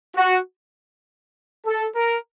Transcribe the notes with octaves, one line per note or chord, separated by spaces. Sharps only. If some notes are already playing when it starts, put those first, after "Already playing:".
F#4
A4
A#4